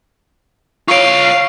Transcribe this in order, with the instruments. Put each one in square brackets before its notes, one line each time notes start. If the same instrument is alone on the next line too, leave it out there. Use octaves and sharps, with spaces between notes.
[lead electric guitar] F4 C#5 [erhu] F5 [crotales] C#6 D7